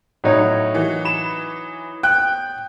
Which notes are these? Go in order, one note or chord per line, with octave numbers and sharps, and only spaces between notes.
A2 F#3 D#4 C#5
E3
B5 E7
G5 F#6